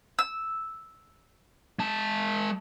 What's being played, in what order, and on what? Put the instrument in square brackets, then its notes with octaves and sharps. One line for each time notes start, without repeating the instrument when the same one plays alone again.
[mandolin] E6
[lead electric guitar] G#3 A5